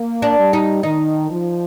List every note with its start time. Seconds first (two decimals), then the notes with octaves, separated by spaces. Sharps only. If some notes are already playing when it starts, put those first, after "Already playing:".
Already playing: A#3
0.22 D4
0.39 G3
0.53 D#4
0.83 D#3 D#4
1.30 F3